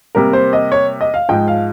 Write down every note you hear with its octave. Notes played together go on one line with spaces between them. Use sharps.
C3 G3 A#3 A#4
C5
D#5
C#5
D#5
F5
G#2 F3 G#3 G5
F5